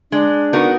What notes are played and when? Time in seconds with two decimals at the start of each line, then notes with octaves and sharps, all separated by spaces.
0.11 G#3 D4
0.53 B3 D#4 F#4 A#4